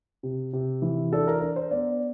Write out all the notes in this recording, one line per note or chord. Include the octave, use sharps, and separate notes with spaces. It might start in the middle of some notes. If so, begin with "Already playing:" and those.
C3
C3
E3
D4 A4
A#4
D4 A#4
C5
B3 D5